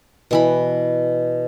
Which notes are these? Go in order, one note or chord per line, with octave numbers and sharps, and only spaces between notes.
B2 E3 B5